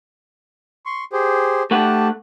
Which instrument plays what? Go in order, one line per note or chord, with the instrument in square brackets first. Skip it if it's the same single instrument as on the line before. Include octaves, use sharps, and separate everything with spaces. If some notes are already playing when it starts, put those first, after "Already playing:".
[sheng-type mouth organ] C6 C#6
G4 G#4 C5
[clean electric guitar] A3 F#5 [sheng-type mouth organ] G4 A5